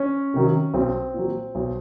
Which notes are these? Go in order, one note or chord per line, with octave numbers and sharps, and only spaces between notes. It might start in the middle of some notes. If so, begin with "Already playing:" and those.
Already playing: C#4
C3 D#3 F#3
B1 C4
A#2 F#3
B1